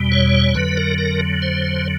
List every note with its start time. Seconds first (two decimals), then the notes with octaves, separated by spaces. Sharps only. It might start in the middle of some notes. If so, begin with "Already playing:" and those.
Already playing: E2 B2 G3
0.12 C#5
0.55 F2 D3 F#3 B4
0.77 A#4
0.98 A#4
1.42 C5